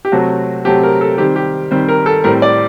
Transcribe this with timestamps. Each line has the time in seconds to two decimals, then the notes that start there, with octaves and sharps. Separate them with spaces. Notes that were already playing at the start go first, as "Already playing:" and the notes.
0.05 G4
0.12 C3 F#3 A3 C4 F#4
0.65 C3 F#3 A3 C4 G4
0.83 A#4
1.01 A4
1.18 D#3 G3 C4 G4
1.36 G4
1.71 D#3 G3 C4 C5
1.88 A#4
2.06 A4
2.24 A2 G3 C4 A#4
2.42 D5